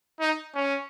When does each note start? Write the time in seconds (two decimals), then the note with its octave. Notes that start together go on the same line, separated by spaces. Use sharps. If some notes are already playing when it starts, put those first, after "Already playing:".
0.20 D#4
0.55 C#4